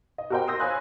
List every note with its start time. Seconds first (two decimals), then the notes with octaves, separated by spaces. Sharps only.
0.18 D#5
0.30 F#4 G4 A#4 C5 D#5 G5
0.47 C6 D#6 E6 G6 A#6
0.60 C5 C#5 F5 G#5 B5 F#6